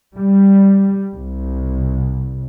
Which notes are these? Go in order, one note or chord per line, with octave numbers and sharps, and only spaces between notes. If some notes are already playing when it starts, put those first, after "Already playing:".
G3
C2